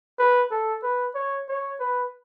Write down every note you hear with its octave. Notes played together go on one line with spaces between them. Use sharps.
B4
A4
B4
C#5
C#5
B4